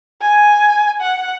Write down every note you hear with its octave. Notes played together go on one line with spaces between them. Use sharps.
G#5
F#5